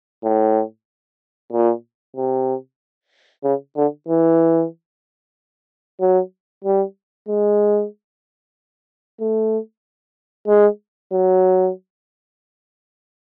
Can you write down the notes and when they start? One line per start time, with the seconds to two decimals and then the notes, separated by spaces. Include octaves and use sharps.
0.24 A2
1.53 A#2
2.16 C3
3.44 C#3
3.77 D3
4.08 E3
6.00 F#3
6.64 G3
7.28 G#3
9.20 A3
10.48 G#3
11.12 F#3